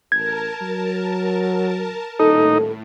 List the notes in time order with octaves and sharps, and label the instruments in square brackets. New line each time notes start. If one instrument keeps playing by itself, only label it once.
[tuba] A1 [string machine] A#4 A5 [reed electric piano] G#6
[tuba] F#3
[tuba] D#1 [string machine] A2 [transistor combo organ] D#4 [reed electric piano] A4